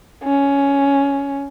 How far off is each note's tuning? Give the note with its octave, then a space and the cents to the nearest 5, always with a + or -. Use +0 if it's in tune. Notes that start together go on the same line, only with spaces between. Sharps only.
C#4 +10